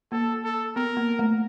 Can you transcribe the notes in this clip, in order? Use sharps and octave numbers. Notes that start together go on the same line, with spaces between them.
A#3 A4
A4
B3 A#4
A#3
A3